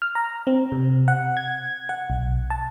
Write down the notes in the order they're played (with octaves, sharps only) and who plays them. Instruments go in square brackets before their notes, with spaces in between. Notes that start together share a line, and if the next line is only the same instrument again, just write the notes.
[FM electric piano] F6
A#5
C4
C3
F#5
G#6
F#5
B1
A5